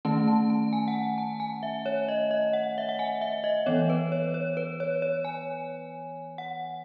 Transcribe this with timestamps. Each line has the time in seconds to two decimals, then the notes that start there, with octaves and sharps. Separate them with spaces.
0.05 D#3 A3 C#4 A5
0.28 A5
0.50 A5
0.73 G#5
0.88 F#5
0.95 G#5
1.18 A5
1.40 G#5
1.63 E5
1.86 C#5
2.09 D#5
2.31 D#5
2.53 F#5
2.78 E5
2.89 F#5
2.99 G#5
3.21 E5
3.44 D#5
3.66 E3 B3 C#5
3.90 B4
4.12 C#5
4.34 C#5
4.57 B4
4.80 C#5
5.02 C#5
5.25 G#5
6.38 F#5